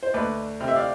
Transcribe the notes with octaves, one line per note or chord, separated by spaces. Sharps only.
C5
D2 B4 D5
C3
E5
D5 F5